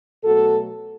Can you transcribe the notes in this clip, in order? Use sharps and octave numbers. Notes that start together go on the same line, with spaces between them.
B2 F#3 A3 F#4 A4